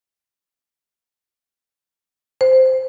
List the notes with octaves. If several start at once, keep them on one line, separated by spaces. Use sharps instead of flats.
C5